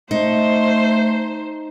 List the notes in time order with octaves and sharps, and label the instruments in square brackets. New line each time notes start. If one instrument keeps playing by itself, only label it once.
[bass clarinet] A3 [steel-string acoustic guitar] D#4 [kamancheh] C5